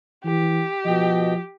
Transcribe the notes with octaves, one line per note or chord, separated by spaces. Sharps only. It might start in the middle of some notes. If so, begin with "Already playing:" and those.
E3 G4
B2 F3 D#5 G5